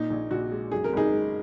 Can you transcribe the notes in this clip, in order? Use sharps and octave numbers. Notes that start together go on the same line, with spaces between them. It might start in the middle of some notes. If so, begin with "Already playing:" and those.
Already playing: A#2 D#4
A#1
A#1 F#4
G#3
F#2 G#4
A#4
G#1 D#4 G#4
G#3